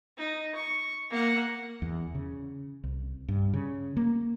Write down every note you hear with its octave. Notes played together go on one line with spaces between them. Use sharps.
D#4
C#6
A#3 F#5
E2
C#3
C2
G2
C#3
A#3